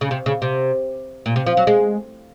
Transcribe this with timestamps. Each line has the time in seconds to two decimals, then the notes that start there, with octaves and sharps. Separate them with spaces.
0.01 C#3
0.11 C3
0.26 C#3
0.42 C3
1.26 A#2
1.36 C3
1.46 F3
1.57 F#3
1.67 G#3